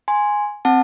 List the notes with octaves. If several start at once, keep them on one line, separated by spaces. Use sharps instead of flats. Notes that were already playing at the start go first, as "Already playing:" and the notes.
G#5 C6
C4 F#5 A5